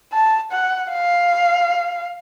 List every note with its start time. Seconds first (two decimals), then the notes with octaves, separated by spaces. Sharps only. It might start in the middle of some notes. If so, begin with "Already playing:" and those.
0.13 A5
0.52 F#5
0.92 F5